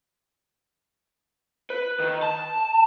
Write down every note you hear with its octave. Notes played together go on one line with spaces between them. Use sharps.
B4
D#3
A5